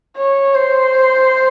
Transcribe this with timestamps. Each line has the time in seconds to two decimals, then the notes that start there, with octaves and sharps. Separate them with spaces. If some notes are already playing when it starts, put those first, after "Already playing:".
0.17 C#5
0.55 C5